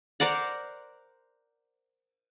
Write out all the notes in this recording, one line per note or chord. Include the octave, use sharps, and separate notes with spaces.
A#4 C5 D5 F#5